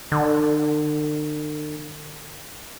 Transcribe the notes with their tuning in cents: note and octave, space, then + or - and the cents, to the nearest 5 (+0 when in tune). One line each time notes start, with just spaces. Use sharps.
D3 +45